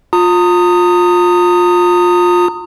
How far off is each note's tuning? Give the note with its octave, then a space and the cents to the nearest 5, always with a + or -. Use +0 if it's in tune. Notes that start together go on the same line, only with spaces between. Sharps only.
F4 +20 A#5 -35 D#6 +0